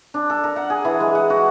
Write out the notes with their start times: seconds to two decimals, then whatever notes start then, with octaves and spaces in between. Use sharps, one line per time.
0.14 D4
0.30 A4
0.44 A#4
0.56 F#5
0.70 G#4
0.85 E3
1.00 G#3
1.15 F#5
1.30 F#4